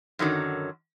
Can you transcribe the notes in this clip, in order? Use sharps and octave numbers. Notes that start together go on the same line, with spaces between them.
F#2 D3 D#3 F#3